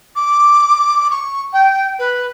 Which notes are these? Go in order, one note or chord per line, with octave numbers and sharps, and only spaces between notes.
D6
C#6
G5
B4